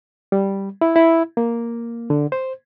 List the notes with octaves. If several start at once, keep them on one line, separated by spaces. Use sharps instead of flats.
G3
E4
E4
A#3
D3
C5